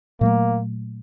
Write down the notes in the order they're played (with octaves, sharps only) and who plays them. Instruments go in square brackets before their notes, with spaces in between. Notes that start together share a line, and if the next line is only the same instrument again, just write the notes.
[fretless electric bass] A#2 F#3 A3 [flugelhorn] A#3